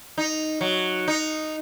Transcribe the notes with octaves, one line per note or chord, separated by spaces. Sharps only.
D#4
F#3
D#4